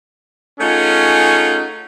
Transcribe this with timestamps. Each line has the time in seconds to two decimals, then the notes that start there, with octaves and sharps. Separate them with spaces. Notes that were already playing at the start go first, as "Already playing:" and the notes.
0.60 A3 C#4 D#4 F4 G#4 F#5